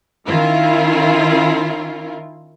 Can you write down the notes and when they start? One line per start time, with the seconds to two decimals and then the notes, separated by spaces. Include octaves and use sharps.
0.28 D#3 C#4 E4 F4 A#4